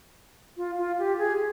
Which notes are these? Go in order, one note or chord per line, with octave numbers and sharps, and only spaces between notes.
F4
F4
G4
G#4